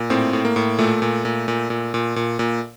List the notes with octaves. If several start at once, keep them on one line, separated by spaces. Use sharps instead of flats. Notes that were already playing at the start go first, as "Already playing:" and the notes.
Already playing: A#2
A2 C4
A2
A#3
A2
A#2 A3
A#2
A#2
A#2
A#2
A#2
A#2
A#2